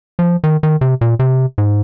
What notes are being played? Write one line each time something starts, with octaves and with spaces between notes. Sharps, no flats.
F3
D#3
D#3
C3
A#2
C3
G#2